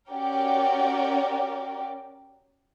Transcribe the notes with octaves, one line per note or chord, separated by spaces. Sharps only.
C#4 F#4 G4 A#4 D5 G5